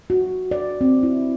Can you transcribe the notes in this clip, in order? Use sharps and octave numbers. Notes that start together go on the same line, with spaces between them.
F#4
D5
C4
E4